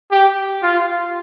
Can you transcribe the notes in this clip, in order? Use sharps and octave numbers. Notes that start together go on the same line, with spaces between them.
G4
F4